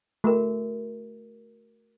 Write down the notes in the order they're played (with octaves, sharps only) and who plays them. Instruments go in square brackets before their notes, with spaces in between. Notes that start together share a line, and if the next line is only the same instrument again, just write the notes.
[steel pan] A3 [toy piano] F#4 G#4 A#4